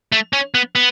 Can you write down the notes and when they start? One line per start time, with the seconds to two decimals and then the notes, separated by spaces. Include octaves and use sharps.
0.12 A3
0.33 C#4
0.54 B3
0.75 B3